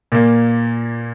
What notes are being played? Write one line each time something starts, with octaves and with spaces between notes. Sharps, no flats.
A#2 A#3